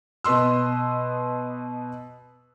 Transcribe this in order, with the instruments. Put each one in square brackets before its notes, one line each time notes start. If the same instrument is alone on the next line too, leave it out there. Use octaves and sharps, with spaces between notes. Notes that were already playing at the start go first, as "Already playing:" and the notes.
[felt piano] B2 B4 D#5 C6 E6